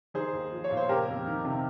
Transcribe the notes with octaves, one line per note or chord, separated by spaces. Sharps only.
D#3 G#4 C5
D#2
F3
C#5
A#2
C5
C#3 G4 A#4
F2
D#3
C3